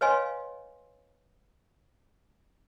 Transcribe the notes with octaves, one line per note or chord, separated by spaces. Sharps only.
B4 C#5 D#5 F5 G#5 C6